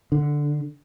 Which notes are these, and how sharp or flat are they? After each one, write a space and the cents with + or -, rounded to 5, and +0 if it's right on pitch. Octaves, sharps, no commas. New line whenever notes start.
D3 +0